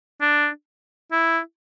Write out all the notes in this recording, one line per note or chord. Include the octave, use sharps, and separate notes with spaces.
D4
E4